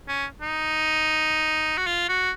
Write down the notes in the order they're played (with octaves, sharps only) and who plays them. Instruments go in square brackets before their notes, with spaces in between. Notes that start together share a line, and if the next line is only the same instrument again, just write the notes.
[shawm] C#4
D#4
F#4
F4
F#4